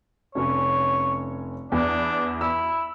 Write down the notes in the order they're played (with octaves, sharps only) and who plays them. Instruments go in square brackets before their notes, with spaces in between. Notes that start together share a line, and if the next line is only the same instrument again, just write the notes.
[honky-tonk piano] F1 C#4 [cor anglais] C#5
[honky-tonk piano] E2 B3 [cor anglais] D4
[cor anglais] E4 [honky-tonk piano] E6